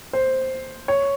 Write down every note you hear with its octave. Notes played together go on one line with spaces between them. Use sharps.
C5
C#5